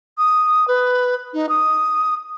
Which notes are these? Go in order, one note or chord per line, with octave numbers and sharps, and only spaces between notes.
D#6
B4
D#4
D#6